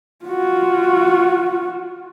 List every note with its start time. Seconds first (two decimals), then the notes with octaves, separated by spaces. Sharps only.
0.25 F4 F#4